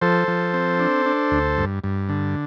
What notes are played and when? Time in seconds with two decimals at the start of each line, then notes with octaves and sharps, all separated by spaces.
0.01 F3 A4 C5
0.28 F3
0.54 C4
0.79 D4
1.06 D4
1.31 D2
1.58 G2
1.84 G2
2.09 D3